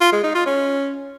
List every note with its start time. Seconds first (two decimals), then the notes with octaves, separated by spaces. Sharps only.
0.01 F4
0.12 G#3
0.24 D#4
0.35 F4
0.46 C#4